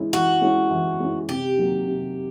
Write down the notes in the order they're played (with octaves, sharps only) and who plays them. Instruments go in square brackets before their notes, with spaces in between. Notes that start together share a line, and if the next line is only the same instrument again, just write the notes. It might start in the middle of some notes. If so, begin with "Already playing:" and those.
Already playing: [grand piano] E3 G#3 C#4 E4
[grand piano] E3 [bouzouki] F#4
[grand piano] G#3 C#4 E4
E3
G#3 C#4 E4
[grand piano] C3 [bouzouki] G4
[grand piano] D#3 F#3 A#3
C3